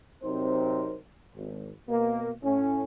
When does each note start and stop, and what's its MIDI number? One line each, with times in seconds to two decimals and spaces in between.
0.23 0.96 48
0.23 0.96 54
0.23 0.96 60
0.23 0.96 63
0.23 0.96 70
0.23 0.96 72
1.36 1.70 32
1.89 2.31 47
1.89 2.31 58
2.43 2.84 45
2.43 2.84 61